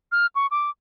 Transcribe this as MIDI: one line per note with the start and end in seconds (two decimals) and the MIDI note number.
0.12 0.26 89
0.35 0.47 85
0.51 0.70 86